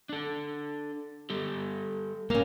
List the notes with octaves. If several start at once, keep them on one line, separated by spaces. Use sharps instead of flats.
D4 A4
G3 G4 A4
G2 A#3 C#4 F5